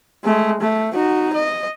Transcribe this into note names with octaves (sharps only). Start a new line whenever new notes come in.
G#3 A3
A3
D#4 F#4
D#5